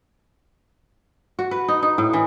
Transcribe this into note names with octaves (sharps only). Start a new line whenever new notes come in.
F#4
B4
D#4
D#4
A2
E3